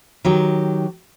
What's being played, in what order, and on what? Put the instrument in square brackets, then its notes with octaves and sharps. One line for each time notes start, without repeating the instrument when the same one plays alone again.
[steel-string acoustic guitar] D#3 F#3 G4